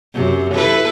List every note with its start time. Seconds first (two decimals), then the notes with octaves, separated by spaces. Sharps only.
0.14 F#2 C3
0.53 E4 A4 B4